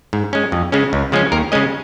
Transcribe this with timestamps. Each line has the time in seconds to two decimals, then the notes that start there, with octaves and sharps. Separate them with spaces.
0.13 G#2
0.33 G#3 C#4
0.52 F2
0.72 C#3 G#3 C#4
0.93 C#2
1.12 C#3 F3 G#3 C#4
1.32 D#2 A#4
1.52 C#3 G#3 C#4 D#5